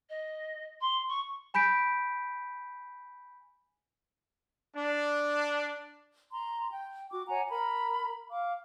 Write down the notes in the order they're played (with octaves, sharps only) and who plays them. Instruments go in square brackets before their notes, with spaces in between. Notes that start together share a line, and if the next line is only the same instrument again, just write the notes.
[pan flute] D#5
C6
C#6
[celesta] G#5 B5 G6 B6 D7
[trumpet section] D4
[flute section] A#5 C6
G5
F#4 D6
C#5 F#5 G#5 A#5
A#4 A#5 B5
F5 D6